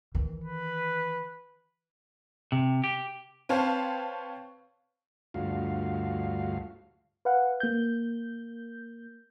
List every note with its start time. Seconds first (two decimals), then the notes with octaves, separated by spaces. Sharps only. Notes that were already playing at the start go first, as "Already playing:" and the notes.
0.15 D#3 E3
0.44 B4
2.52 C3
2.84 G4
3.49 C4 B4 C#5 F5 A5
5.34 D2 G2 A3 F4 F#4 F5
7.25 B4 F5 F#5
7.60 A#3 G6